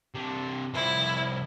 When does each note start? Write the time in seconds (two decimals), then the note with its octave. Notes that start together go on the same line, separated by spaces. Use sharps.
0.15 C3 D4
0.74 C2 F3 E4